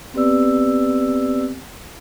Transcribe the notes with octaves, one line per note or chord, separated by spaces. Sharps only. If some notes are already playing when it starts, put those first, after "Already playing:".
B3 C4 G4 B4 D5 E6